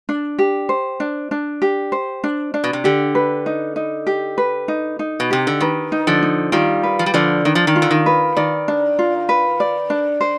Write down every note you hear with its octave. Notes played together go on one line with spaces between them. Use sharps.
D4
G4
C5
D4
D4
G4
C5
D4
D4
B2
C3
D3 G4
B4
D#4
D#4
G4
B4
D#4
D#4
B2
C3 G4
D3
D#3 B4
D#4
D3 F3
D#4
D#3 G3 F4
B4
F3
G3
D3 F3 D5
D#3 D4
F3
D#3
F4
D3
D#3
B4
D#3 D5
D4
F4
B4
D5
D4
C5